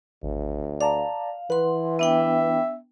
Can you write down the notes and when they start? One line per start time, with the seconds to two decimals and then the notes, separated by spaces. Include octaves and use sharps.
0.23 G#1 D2
0.81 D5 F5 A5 A#5
1.50 E3 B4 F#5 C6
1.99 B3 D4 E5 G5